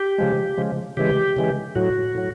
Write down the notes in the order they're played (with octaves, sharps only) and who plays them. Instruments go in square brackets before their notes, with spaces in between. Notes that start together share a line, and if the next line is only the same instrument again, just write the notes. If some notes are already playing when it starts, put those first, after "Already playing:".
Already playing: [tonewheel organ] G4
C#3 F3 G#3
C#3 F3 G#3
C#3 E3 G#3 G4
C#3 E3 G#3
A2 F#3 F#4
A2 F#3